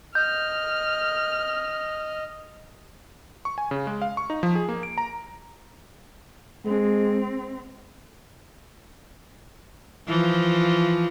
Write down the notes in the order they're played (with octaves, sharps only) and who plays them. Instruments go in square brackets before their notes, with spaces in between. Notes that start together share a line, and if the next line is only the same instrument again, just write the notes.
[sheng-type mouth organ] D#5 [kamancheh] F6 [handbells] G6
[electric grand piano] C#6
G#5
C#3
G#3
F5
C#6
D#4
F3
G#4
A#3
D7
A#5
[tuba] G#3 [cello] C4
[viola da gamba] E3 F3